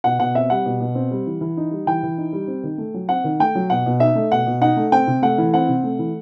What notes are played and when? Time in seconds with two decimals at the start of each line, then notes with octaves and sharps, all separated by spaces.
0.04 B2 F#5
0.19 B2 F#5
0.35 C4 E5
0.50 G3 F#5
0.66 B2
0.80 B2
0.95 C4
1.11 G3
1.27 E3
1.41 E3
1.57 D#4
1.71 G3
1.87 E3 G5
2.03 E3
2.18 D#4
2.33 G3
2.48 C4
2.63 D#3
2.78 A3
2.94 F#3
3.09 C4 F#5
3.24 D#3
3.40 A3 G5
3.55 F#3
3.70 B2 F#5
3.86 B2
4.00 D#4 E5
4.15 A3
4.32 B2 F#5
4.47 B2
4.61 D#4 F#5
4.77 A3
4.92 C4 G5
5.07 C3
5.22 A3 F#5
5.38 E3
5.54 C4 F#5
5.68 C3
5.83 A3
5.99 E3